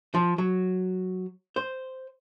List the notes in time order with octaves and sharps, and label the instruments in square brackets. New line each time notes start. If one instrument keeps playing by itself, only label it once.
[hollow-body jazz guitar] F3
F#3
C5